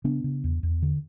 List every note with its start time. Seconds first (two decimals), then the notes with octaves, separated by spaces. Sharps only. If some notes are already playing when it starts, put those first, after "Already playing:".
0.04 C#3 B3 D4
0.24 C#3
0.44 E2
0.63 E2
0.82 D3